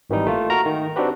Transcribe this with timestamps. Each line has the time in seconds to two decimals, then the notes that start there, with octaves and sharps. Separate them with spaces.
0.10 G#1 D#3 E3 G3 D#4
0.27 A3 A#3 F4
0.50 F#4 A#4 A#5
0.66 D#3
0.96 C4 D4 D#4 F#4 G4 B4